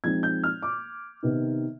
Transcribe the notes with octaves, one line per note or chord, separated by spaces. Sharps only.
F3 G#3 C4 D#4 G#6
G6
F6
D6
C3 D#3 B3 D#4